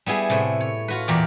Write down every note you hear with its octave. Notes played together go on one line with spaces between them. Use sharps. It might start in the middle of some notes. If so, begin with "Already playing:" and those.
G3 B3 E4 G#4
A2 C3
C#5
F4 F#4 B4
E2 A#2 G4 A#4 D5